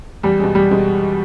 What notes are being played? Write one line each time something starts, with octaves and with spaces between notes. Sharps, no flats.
E2 G3
B2 G#3
E2 G3
B2 G#3